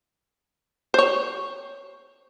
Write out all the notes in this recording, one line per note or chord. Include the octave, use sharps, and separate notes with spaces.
C5 C#5